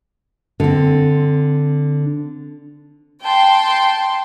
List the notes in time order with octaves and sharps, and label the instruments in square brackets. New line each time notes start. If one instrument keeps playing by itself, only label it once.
[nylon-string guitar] D3 C4
[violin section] G5 A5 C6